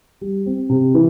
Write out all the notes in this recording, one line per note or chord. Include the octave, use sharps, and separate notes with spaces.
G3
C4
C3
E3